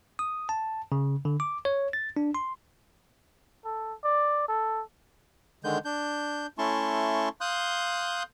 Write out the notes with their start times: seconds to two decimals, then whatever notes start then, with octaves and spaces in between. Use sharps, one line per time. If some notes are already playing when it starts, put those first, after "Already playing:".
0.19 D#6
0.49 A5
0.92 C#3
1.25 D3
1.40 D6
1.65 C#5
1.93 A6
2.17 D4
2.35 C6
3.65 A4
4.04 D5
4.48 A4
5.64 D3 D#3 G#3 G6
5.85 D4 G6
6.58 A3 C#4 E4 A5 C6 C#6
7.41 F5 C6 D#6 F#6 G6